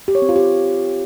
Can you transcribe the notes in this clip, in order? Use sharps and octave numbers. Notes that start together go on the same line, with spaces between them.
G4
C#5
C4
F4
G4